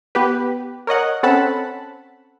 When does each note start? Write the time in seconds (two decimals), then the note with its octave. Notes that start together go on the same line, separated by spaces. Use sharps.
0.15 B3 G4 B4
0.87 A#4 C#5 D#5 F#5
1.23 C4 C#4 A4 F#5 A5 B5